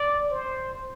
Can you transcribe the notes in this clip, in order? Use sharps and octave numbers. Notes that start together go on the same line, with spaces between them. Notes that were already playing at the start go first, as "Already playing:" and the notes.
Already playing: D5
C5